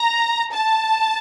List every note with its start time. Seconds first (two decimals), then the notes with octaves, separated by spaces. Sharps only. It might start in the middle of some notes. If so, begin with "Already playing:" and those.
Already playing: A#5
0.52 A5